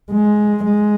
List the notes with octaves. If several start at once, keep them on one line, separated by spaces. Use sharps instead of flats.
G#3
G#3